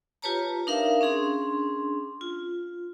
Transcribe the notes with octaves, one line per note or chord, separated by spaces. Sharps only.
F4 G4 B4 C#5 A5 A#5
D4 D#4 A#4 E5 F5
C#4 D4 G#4 C6
F4